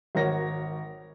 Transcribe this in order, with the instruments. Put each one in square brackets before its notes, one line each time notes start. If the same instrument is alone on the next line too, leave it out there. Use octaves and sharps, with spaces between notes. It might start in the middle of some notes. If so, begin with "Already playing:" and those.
[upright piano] G#1 F#4 A#4 C#5 A#6